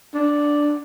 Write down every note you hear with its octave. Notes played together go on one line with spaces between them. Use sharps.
D4